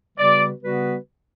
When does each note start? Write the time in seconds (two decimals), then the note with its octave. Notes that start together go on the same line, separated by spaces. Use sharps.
0.17 C#3 G3 B3 F#4 B4 D5
0.61 C#3 G3 B3 F#4 B4